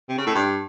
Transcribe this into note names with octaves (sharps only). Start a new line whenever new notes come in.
C3
C#3
A2
G2